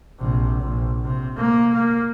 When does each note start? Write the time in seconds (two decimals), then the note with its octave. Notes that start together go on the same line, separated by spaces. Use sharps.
0.20 A#1 C3
0.61 A#1
1.05 C3
1.37 A#3
1.74 A#3